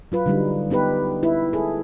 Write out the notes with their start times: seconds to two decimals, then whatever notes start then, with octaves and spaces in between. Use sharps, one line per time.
0.12 F#3 F4 B4
0.26 D3 G3 D#4
0.70 B3 D#4 G4 B4
1.23 E4 B4
1.53 G#4 A4